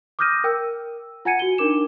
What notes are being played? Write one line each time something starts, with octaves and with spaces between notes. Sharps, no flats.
D6 D#6 F6 G6 A#6 D#7
A#4 G5 E6
F4 F#5 G#5 G#6 C#7 D#7
F#4 G7
D4 D#4 A#4 D6 E7